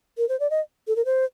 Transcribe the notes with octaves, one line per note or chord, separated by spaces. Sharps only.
A#4
C5
D5
D#5
A4
A#4
C5